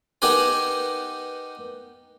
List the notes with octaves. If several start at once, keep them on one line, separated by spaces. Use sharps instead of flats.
B3 D#4 G4 A#4 B4 G#5